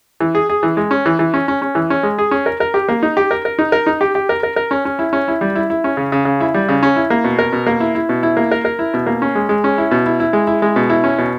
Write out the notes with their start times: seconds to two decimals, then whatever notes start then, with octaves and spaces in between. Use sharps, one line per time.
0.21 E3
0.35 G#4
0.50 G#4
0.63 E3
0.77 G#3
0.91 C#4
1.06 E3
1.19 E3
1.34 C#4
1.48 C#4
1.62 C#4
1.75 E3
1.90 C#4
2.03 G#3
2.19 G#4
2.31 C#4
2.46 A#4
2.60 A#4
2.74 G4
2.89 A#3
3.03 D#4
3.17 G4
3.31 A#4
3.45 A#4
3.59 D#4
3.72 A#4
3.87 D#4
4.01 G4
4.15 G4
4.29 A#4
4.43 A#4
4.56 A#4
4.71 C#4
4.85 C#4
4.99 E4
5.13 C#4
5.28 E4
5.41 G3
5.55 E4
5.70 E4
5.84 C#4
5.97 C#3
6.12 C#3
6.25 C#3
6.41 E4
6.54 G3
6.69 C#3
6.83 C#4
6.96 E4
7.10 A#3
7.24 B2
7.39 A#4
7.53 B2
7.67 A#3
7.80 E4
7.95 E4
8.09 B2
8.23 E4
8.37 A#3
8.51 A#4
8.65 A#4
8.79 E4
8.94 B2
9.07 A#3
9.22 C#4
9.35 G#3
9.49 G#3
9.64 C#4
9.78 E4
9.91 B2
10.06 E4
10.20 E4
10.33 G#3
10.47 E4
10.62 G#3
10.76 B2
10.90 E4
11.04 C#4
11.18 B2